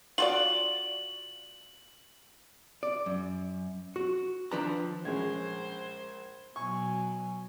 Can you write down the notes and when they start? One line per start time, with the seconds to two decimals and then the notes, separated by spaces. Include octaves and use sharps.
0.18 F4 F#4 D5 F#7
2.83 D5
3.06 F#2
3.96 F#4
4.52 D#3 F3 D4 B4 A5 A#5
5.05 A#1 G#3 C#4 C5 G#6
6.56 B2 F#3 G#5 C#6